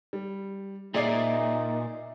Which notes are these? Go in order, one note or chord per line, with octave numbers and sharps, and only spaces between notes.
G3
A#2 D#4 G#4 D5 E5 C7